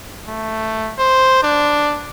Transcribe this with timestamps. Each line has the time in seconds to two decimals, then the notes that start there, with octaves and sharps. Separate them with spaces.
0.28 A3
0.99 C5
1.43 D4